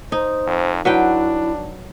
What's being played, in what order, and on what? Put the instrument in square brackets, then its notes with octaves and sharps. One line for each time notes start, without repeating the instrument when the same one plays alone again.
[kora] D#4 [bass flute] C5
[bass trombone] F2
[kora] F#3 B4 G5 [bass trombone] D4 [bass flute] E4